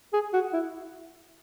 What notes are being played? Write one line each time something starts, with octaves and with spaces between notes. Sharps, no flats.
G#4
F#4
E4